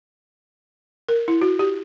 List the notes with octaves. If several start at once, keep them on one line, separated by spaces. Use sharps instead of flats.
A#4
E4
F#4
G4